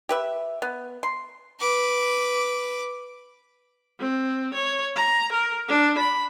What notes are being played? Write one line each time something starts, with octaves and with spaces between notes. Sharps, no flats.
G4 B4 E5
B3
C6
B4 D6
C4
C#5
A#5
A#4
D4
B5